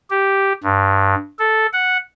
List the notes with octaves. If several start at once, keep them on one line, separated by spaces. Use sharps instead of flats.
G4
G2
A4
F#5